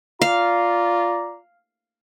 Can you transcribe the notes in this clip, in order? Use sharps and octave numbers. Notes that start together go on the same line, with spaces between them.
F4 D5 F5 A#5